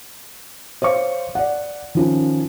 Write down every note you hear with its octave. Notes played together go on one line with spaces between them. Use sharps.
C5 C#5 F5 C#6
D5 F#5
D#3 F3 C#4